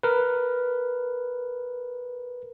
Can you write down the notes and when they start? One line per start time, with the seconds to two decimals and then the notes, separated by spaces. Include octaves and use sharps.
0.03 A#4 B4